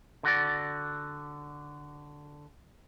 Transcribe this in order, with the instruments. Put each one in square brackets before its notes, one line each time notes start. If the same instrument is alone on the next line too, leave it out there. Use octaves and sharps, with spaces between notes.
[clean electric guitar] D3 F#4 D5